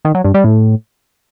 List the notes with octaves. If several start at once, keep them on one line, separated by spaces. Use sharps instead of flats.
D#3
F#3
G2
G3
A2